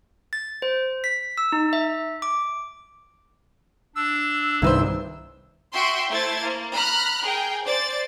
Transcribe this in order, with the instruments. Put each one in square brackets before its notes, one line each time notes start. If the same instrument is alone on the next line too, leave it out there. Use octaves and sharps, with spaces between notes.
[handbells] A6
C5
B6
E6
D#4
E5
D6
[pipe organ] D4 [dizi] E6
[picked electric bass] C2 G2 D#3 [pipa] E4 B4 C5 [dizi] E6
[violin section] F#4 E5 G5 C6
A3 E4 C5 G#6 A6
A#3
A#5 B5 F6 F#6
G#4 A#4 G5
C5 D5 A6